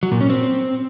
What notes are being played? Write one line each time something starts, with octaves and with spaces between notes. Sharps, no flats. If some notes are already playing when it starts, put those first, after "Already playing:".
F#3
A#2
C#4
C4